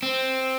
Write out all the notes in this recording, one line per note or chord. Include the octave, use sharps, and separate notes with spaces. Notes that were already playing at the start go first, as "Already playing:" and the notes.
C4